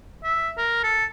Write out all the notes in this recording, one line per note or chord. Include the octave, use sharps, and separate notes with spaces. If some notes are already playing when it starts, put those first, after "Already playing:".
E5
A#4
A4